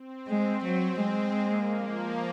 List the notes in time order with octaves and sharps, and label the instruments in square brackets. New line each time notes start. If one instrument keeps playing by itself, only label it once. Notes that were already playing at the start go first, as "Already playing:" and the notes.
Already playing: [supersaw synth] C4
[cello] G#3
F#3
G#3
[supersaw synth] A#3
F3